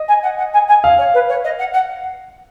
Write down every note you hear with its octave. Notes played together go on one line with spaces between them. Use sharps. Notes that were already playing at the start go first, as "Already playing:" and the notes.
Already playing: D#5
G#5
F#5
F#5
G#5
G#5
F5
C#5
B4
C#5
D#5
F#5
F#5